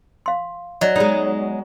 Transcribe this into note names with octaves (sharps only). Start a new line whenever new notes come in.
F5 C6
F#3 D5 D#5
G#3 B3 D#4 D5